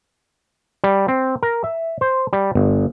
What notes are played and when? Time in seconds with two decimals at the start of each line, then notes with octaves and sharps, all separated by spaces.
0.84 G3
1.08 C4
1.43 A#4
1.64 E5
2.01 C5
2.33 G3
2.55 G1